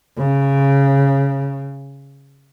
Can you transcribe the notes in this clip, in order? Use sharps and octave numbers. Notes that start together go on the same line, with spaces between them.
C#3